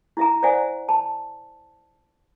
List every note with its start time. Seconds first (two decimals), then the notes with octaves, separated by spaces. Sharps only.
0.17 E4 E5 A#5
0.43 C5 D5 E5 F#5 G#5
0.89 A5